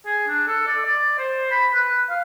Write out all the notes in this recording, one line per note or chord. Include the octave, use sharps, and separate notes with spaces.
G#4
D4
A4
D5
D5
C5
B5
B4
F5